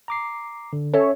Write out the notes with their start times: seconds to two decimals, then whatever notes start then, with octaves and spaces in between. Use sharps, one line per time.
0.08 A#5 D6 C7
0.73 D3
0.94 C#4 A4 C#5 E5